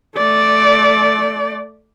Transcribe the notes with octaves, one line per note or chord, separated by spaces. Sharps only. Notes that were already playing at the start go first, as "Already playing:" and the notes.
A3 D5